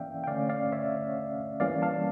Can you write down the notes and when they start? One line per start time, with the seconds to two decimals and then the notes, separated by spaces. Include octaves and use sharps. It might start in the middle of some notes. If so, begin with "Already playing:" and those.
Already playing: E3 A#3 C#4 D5 E5 F5 G5
0.24 G5
0.27 D3 A3 C#4 D5 F5
0.49 D5 F5
0.72 C#5 E5
1.60 E3 G3 A#3 C#4 D5 F5
1.82 F5 A5